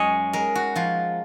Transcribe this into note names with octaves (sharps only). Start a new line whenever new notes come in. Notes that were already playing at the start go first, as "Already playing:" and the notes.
Already playing: F#2 G#3 C#5 D#5
G#3 A#4
F#4
F3 F4